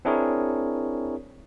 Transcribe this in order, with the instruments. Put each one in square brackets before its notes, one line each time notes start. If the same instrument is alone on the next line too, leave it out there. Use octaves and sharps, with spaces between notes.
[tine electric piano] C4 D4 E4 G#4 A#4 C#5